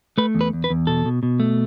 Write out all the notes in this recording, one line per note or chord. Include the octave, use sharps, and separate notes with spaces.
A3 B4
E2
B4
E2
B4
E2
B2 A4
B2
B2
A3